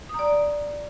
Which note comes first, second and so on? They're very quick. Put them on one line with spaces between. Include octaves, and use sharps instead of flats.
D#6 A#5 D5